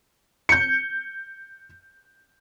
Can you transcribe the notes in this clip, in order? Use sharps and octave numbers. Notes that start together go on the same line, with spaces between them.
G6 C#7